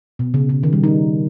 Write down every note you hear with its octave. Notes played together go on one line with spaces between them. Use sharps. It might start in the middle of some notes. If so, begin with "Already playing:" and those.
B2
C#3
C#3
D#3
G3
D#4